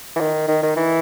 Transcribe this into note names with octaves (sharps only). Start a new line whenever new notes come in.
E3
D#3
D#3
D#3
E3